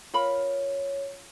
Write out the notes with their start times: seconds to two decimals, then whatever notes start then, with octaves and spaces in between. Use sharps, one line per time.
0.14 F4 A#4 C#5 B5